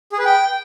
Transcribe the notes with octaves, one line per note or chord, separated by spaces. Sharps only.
G#4
B4
G5